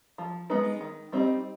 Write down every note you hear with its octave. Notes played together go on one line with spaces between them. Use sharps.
F3
G#3 B3 D#4 B4
D#3
G3 C4 D#4